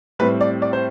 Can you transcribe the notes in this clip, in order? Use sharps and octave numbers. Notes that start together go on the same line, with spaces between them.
A2 G3 C4 B4
D5
D5
C5